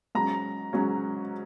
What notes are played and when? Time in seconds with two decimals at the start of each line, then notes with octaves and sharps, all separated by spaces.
0.15 G#2 F#3 C#4 A#5
0.73 G#2 F#3 C#4